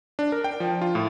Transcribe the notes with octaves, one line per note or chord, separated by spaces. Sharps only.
D4
A#4
G5
F3
F4
A2